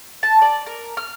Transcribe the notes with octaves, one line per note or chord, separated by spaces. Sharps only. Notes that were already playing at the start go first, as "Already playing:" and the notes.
A5
D5
A#4
F6